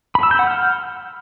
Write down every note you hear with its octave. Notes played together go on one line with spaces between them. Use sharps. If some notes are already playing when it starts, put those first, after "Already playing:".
B5
E6
G6
F#5
F6